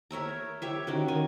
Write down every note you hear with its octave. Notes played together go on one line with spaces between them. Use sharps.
A#4 C#5 E5 A#5
G4 C#5 E5
D#3 C#4 F#4
D#3 G#5